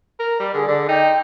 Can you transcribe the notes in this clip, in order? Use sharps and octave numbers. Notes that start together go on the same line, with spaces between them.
A#4
G3 D5
D3 G#4
D3 D5
D#4 G5